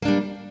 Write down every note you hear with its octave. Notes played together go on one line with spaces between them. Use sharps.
G3 A#3 D4